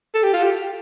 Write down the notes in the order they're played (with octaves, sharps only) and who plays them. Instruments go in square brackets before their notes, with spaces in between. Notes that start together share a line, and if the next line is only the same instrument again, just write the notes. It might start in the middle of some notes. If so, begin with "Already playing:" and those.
[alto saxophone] A4
G4
F4
G4